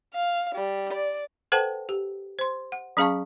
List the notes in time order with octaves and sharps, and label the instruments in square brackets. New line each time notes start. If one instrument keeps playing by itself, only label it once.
[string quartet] F5
G3
D5
[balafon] A4 B4 C5 F#5 G5 A5
G4
C5 C6
F#5
F#3 C#4 G#4 F5 A5 C#6